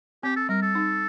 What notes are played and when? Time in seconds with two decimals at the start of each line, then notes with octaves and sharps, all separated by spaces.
0.23 C4 G4
0.36 A4
0.49 G3 A#4
0.62 A4
0.75 D#4